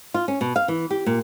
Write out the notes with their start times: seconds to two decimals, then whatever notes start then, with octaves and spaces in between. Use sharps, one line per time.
0.14 F4
0.28 C#4
0.41 B2
0.56 F5
0.68 E3
0.90 G4
1.06 A#2